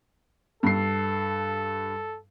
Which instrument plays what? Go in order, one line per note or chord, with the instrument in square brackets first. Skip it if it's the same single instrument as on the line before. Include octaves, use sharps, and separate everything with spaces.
[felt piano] G2 C7 [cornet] A4